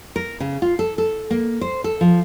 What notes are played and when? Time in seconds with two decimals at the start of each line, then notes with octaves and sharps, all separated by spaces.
0.16 A#4
0.40 C#3
0.62 F4
0.79 A4
0.98 A4
1.31 A#3
1.61 C5
1.84 A4
2.01 F3